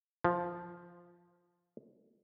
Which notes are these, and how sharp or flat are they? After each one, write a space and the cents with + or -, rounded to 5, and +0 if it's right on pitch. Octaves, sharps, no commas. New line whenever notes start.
F3 +0